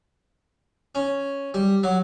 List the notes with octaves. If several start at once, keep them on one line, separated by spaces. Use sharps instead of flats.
C#4
G3
F#3